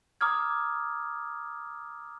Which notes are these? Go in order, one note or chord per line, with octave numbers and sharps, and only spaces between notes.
A#5 D6 D#6 F6 G#6